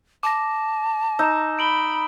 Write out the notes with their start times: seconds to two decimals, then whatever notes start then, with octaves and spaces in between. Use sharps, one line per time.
0.23 A5 D6 A#6
1.19 D#4 E6 E7
1.59 B5 D7 F#7 G7